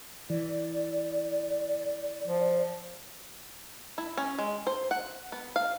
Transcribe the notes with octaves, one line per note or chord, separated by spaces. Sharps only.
E3 D5
F3
E4
C#4
G#3
C5
F#5
B3
F5